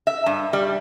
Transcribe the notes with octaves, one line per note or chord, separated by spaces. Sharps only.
E5
G2
G3